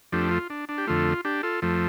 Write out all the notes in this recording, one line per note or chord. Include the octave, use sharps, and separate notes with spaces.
F2 F3 A3 D4 G4
F4
D4
D4
G4
F2 D3 A3 F4
D4 G4
F4 A4
F2 F3 A3